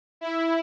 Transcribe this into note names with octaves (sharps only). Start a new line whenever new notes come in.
E4